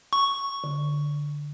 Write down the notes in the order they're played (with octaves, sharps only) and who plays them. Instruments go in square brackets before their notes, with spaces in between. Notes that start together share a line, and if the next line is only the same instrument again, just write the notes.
[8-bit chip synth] C#6
[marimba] D3